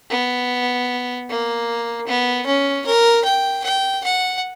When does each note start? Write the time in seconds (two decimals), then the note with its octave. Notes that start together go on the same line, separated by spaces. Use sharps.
0.10 B3
1.29 A#3
2.07 B3
2.46 C#4
2.86 A#4
3.25 G5
3.64 G5
4.04 F#5